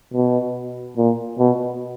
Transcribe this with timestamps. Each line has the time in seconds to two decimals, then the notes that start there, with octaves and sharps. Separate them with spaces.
0.14 B2
0.97 A#2
1.39 B2